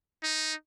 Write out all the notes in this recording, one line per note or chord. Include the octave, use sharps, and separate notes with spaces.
D#4